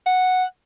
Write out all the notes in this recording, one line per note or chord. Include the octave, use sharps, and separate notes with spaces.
F#5